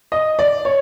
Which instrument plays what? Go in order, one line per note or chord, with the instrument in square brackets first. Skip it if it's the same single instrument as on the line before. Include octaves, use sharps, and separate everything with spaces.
[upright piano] D#5
D5
C#5